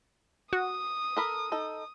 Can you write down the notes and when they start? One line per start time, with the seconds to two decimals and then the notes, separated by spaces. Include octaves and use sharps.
0.53 F#4 D#6
1.17 A4 A#4 B5
1.52 D#4 A4